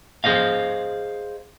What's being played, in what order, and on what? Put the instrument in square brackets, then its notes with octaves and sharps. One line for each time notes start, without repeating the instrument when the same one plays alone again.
[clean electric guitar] G#4 C5 D#5 F5